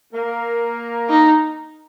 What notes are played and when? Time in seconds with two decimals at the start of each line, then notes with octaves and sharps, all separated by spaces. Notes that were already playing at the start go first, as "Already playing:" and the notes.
0.13 A#3 A#4
1.09 D#4